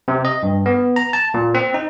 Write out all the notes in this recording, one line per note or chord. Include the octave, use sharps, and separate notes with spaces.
C3
D#5
G2
B3
A#5
A5
A#2
C4
D#4